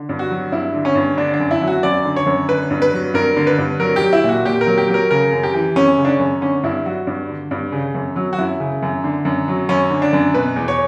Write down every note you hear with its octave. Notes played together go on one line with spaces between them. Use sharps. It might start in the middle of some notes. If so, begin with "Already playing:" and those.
Already playing: D3
G2
F#4
F#3
G2 E4
D3
C#4
G2
D3 D4
D4
F#2
E4
F#3
F#4
F#2 D5
D3
C#5
F#2
D3 B4
G2
B4
F#3
G2 A#4
D3
B4
G2
F#3 A#4
F#3 G4
E4
A#2 F#4
A#2 G4
A#4
F#3
G4
F#3
A#4
C#3 A#4
F#2
G4
E3
F#2 C#4
C#3
D4
C#4
F#2
D3 C#4
G2 E4
F#3 F#4
G2
D3
G2
C#3
F#2
F#3
F#4
F#2 E4
C#3
F#2
D3
F#2
F#3
F#2 C#4
D3
D4
F#2
B2 B4
E2
C#5